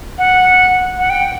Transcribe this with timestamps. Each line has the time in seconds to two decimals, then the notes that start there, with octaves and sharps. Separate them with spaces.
0.18 F#5
0.98 F#5
1.09 G5